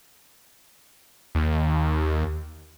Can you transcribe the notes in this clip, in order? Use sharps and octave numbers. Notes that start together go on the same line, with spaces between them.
D#2